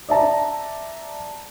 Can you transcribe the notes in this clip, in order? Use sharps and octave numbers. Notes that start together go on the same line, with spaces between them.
D5 E5 A5 A#5